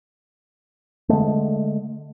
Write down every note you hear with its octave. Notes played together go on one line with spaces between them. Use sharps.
D3 E3 G#3 A3